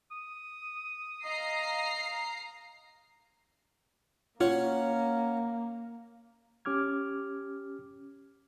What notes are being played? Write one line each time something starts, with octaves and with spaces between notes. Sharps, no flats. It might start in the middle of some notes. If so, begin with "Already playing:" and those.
D#6
D#5 F5 A#5 C7
A#3 C#4 F4 C#5 F#5
C#4 G4 D6 F6 G#6